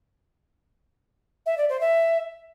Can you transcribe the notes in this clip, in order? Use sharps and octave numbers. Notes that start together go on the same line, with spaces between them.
E5
D5
C5
E5